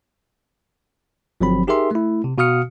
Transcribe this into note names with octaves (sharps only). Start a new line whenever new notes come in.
G1 F3 F#3 C4 B5
D#4 G4 G#4 A#4 E5 C6
A3 E4
C3
B2 F#4 F5 D#6 F6 C#7